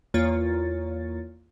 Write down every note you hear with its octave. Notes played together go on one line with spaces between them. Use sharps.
E2 A#3 F4 C#5 A6